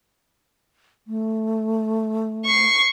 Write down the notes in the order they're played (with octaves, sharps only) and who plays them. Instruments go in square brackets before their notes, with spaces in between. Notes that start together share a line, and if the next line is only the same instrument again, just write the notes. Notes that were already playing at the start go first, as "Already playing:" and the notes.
[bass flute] A3
[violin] C#6 C7